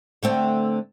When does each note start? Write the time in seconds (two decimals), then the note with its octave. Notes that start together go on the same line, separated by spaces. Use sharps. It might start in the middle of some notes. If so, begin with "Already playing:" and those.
0.23 D3 A3 C4